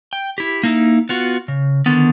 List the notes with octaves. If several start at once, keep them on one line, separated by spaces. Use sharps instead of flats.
G5
E4 G4
A#3 D#4 E4
B3 F4 F#4
C#3
D3 D#3 B3